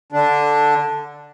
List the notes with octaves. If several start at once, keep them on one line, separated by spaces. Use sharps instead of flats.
D3 D4